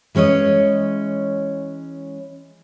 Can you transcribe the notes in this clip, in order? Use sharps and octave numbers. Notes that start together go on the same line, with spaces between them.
E3 G#3 C#4 C#5 D#5